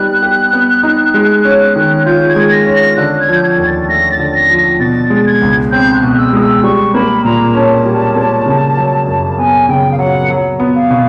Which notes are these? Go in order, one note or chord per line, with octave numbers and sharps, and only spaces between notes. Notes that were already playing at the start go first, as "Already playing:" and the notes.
Already playing: G3 B3 D#4 F#6
G4
B3
D#4
G#3
C#4
D#3
F4 G6
G#6
G#3
A#6
C#4
A#6
D3 F#6
G#6
F3
G6
G#6
D#2
A6
A3 A#6
A6
D3
A#6
F3
A#6
B2 A6
G#3
G#6
C#2
C4 G6
F#6
B2
E6
G#3 D#6
E6
G3 C#6
A#3 B5
A#2 A#5
C#4 A5
G3
A#3
C#3
F#3
F#2
B3 G#5
C#3 G5
F5
F#3 F#5
F#3
B3
F5
B2